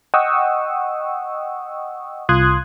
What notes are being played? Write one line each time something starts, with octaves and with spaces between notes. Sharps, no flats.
D#5 F#5 G5 C#6 D#6 E6
C2 F4 C6 D#6 F#6 G#6